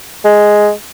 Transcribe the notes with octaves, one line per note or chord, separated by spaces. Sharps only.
G#3